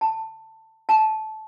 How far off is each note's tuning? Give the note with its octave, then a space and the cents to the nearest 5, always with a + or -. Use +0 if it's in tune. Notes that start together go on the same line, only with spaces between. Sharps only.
A5 +15
A5 -15